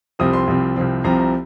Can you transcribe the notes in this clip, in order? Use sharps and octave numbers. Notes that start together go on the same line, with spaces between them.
C2 C3 F3 C4 D#6
C6
C2 C3 F3 C4
C2 C3 F3 C4
C2 C3 F3 C4 A#5
A#5